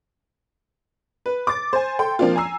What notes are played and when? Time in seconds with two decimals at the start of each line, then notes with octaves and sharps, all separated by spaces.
1.26 B4
1.47 D6 A6
1.73 C5 G#5
1.99 A4 G5 C6
2.19 F3 A#3 C4 D4 F4
2.36 G#5 A#5 E6 C7